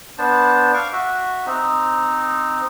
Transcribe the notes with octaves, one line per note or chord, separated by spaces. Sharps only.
B3 D4 C5 A5
F5 C#6 D6
F#4 E5
C4 D#4